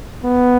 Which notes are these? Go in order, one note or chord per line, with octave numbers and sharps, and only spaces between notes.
B3